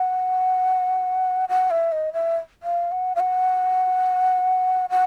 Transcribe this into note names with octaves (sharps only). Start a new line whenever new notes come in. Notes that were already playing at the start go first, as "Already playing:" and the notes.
Already playing: F#5
F#5
E5
D#5
E5
F5
F#5
F5
F#5
F#5